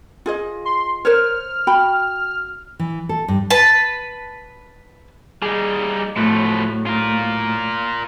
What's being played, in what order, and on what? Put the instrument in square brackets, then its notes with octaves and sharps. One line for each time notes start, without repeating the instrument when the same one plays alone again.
[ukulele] F4 G#4 D#5
[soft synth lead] C6
[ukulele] A#4 C5 C#5 [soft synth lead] F6
[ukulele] F#4 G5 B5
[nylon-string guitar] E3
A4
G2
[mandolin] B4 A5
[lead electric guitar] G3 D#4 [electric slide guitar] G#4
[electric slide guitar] A2 F#3 A3 [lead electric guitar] F3 B4
[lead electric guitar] F4 A#4